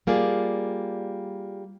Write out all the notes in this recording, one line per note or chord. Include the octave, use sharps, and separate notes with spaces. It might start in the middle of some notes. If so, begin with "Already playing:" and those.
G3 A#3 F4 G#4 D5